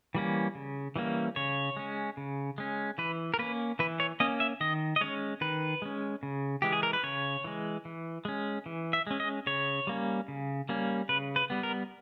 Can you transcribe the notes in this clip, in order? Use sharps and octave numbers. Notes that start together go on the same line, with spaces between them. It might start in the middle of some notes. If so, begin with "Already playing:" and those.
E3 G3 A#3 C#4
C#3
E3 G3 A#3 C#4
C#3 C#5
G#3 C#4
C#3
G#3 C#4
E3 B4
A#4
A#3 C#4 B4
E3 B4
C#5
A#3 C#4 D#5
E5
D#3 D#5
D#5
G#3 C#4 C#5
D#3 B4
G#3 C#4
C#3
E3 G#3 G4
G#4
A#4
B4
C#3 C#5
E3 G#3
E3
G#3 C#4
E3
E5
G#3 C#4
D#5
C#3 C#5
G3 A#3 C#4
C#3
G3 A#3 C#4
C#3 B4
B4
G3 B3
A#4